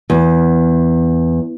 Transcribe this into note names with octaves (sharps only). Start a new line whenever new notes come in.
E2